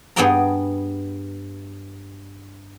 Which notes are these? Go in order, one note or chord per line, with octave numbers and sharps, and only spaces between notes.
G2 B3 G#4 D5 G5 A#5